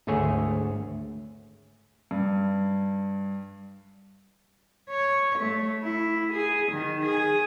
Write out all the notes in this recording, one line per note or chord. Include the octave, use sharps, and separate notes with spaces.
G#1 D2 A3 G#4 C#5 E5
G2
C#5
A3
E4
G#4
D#3
G#4